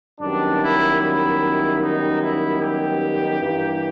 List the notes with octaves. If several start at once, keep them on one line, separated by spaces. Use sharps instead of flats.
F#2 D#3 G3 B3 D4
E4
E4
D#4
E4
G4
G2 E3 G3 A#3